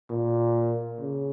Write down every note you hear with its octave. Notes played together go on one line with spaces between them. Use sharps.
A#2
C#3